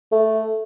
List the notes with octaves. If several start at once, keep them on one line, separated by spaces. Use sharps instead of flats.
A3